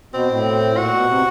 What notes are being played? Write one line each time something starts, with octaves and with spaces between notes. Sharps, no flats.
B2 C4
A2
A#2 F#4
B2
C3